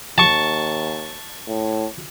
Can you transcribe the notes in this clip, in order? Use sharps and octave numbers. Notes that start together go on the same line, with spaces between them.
D#2 A5 C#6
A2